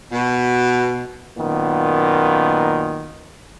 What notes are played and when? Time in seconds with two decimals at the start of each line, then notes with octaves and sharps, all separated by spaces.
0.12 B2
1.38 F#2 A#2 D#3 A#3 B3